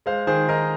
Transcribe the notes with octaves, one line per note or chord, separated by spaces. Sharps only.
G#3 C5 F5
D#3 G#4 C5
D#3 A#4 D#5